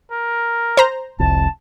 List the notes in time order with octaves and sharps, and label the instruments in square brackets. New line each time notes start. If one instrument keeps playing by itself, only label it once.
[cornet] A#4
[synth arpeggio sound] C5 A#5
[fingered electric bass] F1 C2 F2 [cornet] A5